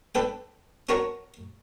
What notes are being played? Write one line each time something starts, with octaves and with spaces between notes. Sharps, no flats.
D4 A4 B4 G5
D4 F#4 A#4 C#5 A#5 C#6